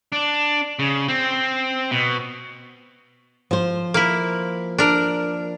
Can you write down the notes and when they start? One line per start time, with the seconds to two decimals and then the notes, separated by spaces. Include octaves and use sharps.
0.12 D4
0.79 C#3
1.08 C4
1.91 B2
3.51 F3 C5
3.94 A#3 E4
4.78 D4 A#4